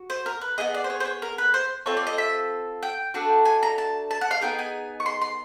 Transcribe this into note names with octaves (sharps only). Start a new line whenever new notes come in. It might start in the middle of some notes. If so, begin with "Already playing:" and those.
Already playing: F#4
C5
A#4
B4
B3 E4 G#4 D#5
D5
C5
C#5
C5
C#5
A#4
B4
C5
C4 F4 A4 C#5
D5
D#5
E5
G5
A3 D4 F#4
G#5
A#5
A5
A5
F#5
F5
B3 D#4 G#4 G5
G#5
C#6
C6
C6